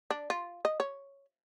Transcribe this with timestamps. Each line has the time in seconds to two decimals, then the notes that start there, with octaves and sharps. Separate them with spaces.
0.11 D4
0.30 F4
0.65 D#5
0.80 C#5